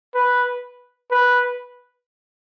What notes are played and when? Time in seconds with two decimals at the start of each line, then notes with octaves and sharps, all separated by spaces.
0.15 B4
1.11 B4